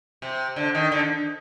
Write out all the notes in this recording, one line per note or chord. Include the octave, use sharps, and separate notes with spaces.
C3
D3
D#3
D3